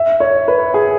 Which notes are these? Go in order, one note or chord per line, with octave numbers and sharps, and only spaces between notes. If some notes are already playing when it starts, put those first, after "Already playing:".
Already playing: E5
C#5
B4
G#4